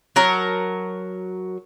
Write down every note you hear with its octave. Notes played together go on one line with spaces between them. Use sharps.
F#3 A#4 A5